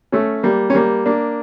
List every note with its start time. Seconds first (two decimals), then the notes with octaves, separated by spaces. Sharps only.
0.12 A3 C#4
0.43 G3 A#3
0.70 C#4
0.75 G3 A#3
1.06 A#3 D4